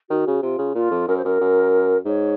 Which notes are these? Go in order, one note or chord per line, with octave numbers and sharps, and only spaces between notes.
D#3 F#4
C#3
C3 F4
C#3
A#2 F4
F2
F#2 A#4
C5
F#2 A#4
F#2
G#2 C#5